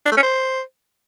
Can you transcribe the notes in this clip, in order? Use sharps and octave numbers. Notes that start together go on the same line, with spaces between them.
D4
A3
C#4
C5